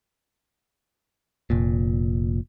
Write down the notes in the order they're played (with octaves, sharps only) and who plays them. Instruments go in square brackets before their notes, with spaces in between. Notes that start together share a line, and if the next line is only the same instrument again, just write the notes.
[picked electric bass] F1 A#2